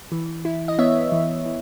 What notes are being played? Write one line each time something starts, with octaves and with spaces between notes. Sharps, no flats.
E3
E4
D#5
B3 C#5 E5
E3
E3